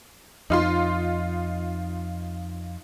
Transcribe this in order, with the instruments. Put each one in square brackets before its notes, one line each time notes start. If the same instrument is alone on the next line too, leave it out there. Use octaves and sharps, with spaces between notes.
[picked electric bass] F2 [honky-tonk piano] D#4 F4 C6